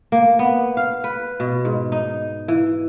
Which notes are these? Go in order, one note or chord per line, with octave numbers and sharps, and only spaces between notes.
A#3
B3
F5
B4
B2
G#2
D#4
E3